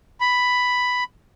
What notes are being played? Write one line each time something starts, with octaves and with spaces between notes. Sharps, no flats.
B5